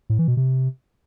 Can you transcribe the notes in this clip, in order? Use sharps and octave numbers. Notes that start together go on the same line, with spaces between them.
A2
E3
B2
C3